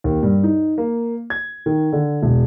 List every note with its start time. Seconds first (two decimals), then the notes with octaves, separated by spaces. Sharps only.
0.04 D#2
0.23 G2
0.43 D#4
0.78 A#3
1.30 G#6
1.66 D#3
1.93 D3
2.22 E1